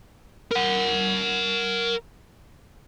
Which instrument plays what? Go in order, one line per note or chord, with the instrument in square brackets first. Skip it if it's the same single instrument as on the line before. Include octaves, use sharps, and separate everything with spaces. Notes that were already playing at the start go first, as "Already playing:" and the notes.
[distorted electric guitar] A#4 F#5